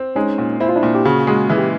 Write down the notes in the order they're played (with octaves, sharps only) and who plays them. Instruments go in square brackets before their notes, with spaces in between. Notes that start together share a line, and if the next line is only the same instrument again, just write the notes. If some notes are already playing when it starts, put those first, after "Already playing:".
Already playing: [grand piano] C4
[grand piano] G#3 [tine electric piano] C#4 D#4
[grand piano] A#2
[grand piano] C4 [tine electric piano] E4
[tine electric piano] F4
D4 E4
[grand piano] A#2
[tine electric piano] G4
[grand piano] C#3 [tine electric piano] F#4 G#4
[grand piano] G#3 [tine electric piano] F#4 G#4
[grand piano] E3 [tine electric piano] G#4
[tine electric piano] G4